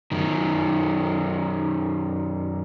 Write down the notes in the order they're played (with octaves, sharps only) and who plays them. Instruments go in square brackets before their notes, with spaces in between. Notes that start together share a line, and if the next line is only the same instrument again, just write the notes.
[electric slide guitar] F#2 D#3